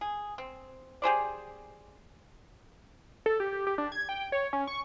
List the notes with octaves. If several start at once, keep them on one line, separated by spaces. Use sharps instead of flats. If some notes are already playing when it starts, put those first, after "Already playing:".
G#4
C4
G4 G#4 C5 D5
A4
G4
G4
D4
G#6
G5
C#5
C#4
C#6